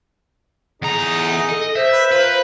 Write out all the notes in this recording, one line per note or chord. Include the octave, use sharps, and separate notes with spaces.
E2 D#4 G#4 A#5
A4 D#5
C5 E5
B4
F4 A#4 B4